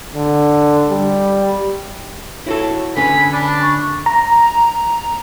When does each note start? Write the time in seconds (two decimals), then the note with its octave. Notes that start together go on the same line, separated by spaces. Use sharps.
0.15 D3
0.91 G3
2.46 E4 F#4 A4 C#5
2.96 D3 C#4 B4 G#5 B5
3.33 D4 B5
3.62 C#6
4.06 A#5